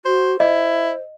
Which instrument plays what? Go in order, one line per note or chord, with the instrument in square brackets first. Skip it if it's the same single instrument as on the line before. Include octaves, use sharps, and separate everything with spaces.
[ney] F#4 [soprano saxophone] C5
[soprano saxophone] E4 [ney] C5 [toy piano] D#5